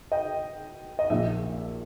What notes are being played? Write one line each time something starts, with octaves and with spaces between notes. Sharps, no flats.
D#5 G5
D#5
A#1 A#2 E5